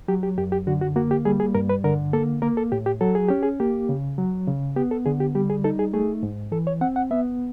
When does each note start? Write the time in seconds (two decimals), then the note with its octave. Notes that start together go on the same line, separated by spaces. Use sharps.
0.08 F#3 G4
0.23 G4
0.38 F#2 G4
0.52 G4
0.67 D3 F#4
0.81 F#4
0.96 A#3 F#4
1.11 G4
1.25 G3 G#4
1.40 G#4
1.55 G2 A#4
1.69 B4
1.84 D3 A#4
2.13 A#3 A4
2.42 A#3 A#4
2.57 A4
2.72 A2 G4
2.86 G4
3.01 F#3 A4
3.15 G#4
3.28 C#4 G4
3.43 G#4
3.60 A#3 G4
3.89 C#3
4.18 F#3
4.47 C#3
4.76 B3 G4
4.91 A4
5.06 D3 G#4
5.20 G4
5.35 G3 G4
5.50 G#4
5.64 D#4 A4
5.79 G#4
5.93 A3 G#4
6.23 G#2
6.52 E3 A4
6.67 C#5
6.81 C4 F#5
6.96 F#5
7.11 B3 E5